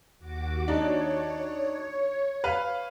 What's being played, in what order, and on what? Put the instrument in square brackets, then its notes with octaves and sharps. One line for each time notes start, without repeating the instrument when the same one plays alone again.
[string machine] D#2 F#4 D6
[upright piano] D4 D#4 [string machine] C#5
[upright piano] B4 F5